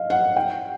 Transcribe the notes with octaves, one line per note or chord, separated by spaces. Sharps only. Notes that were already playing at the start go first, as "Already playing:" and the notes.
Already playing: D#5 F5
F#5
G5